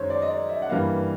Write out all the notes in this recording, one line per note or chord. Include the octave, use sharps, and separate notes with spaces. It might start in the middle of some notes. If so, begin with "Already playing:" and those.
Already playing: F#2 D#3 G#3 C5 C#5
D5
D#5
D5
E5
F#5
G2 E3 G3 A#3 F5